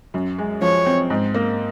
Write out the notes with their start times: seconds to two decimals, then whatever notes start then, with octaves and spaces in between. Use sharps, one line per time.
0.14 F#2
0.38 G#3
0.61 F3 C#5
0.86 C4
1.10 G#2
1.34 A#3